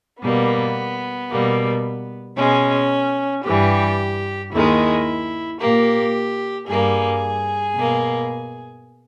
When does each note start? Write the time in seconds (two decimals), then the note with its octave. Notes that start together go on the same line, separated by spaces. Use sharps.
0.22 B2 G3 A#3 B3
1.30 B2 G3 A#3
2.37 B2 G#3 C#4
3.45 G2 E3 G3 G4
4.52 D#2 D#3 G#3 E4
5.60 A#2 A#3 G4
6.68 G2 G3 A#3 G#4
7.76 B2 A#3